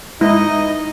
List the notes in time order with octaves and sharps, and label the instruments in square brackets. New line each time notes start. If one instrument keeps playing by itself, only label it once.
[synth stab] G#2 [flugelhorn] D#4 [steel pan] E4 [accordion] D#5